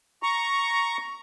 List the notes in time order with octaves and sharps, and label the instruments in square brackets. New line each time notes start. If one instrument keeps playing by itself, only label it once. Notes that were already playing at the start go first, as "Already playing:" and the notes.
[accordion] A#5 C#6